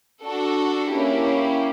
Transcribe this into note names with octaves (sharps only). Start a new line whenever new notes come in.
D4 F#4 A4
A#3 C#4 E4 G4